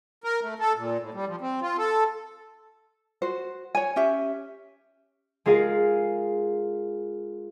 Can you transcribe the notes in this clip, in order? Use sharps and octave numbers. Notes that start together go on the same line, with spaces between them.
A#4
A3
A4
A#2
A2
G3
F3
C4
F4
A4
F#4 C5
C#5 G#5
C#4 G4 E5
G#3 F4 G#4 A#4 F5 C7